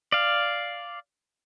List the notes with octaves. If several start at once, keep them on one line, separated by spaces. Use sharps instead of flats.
D5 F5